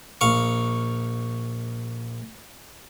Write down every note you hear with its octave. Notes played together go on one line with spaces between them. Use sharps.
A#1 F5 C#6